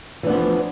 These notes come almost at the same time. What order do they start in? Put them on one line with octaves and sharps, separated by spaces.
E3 D4 B3 F3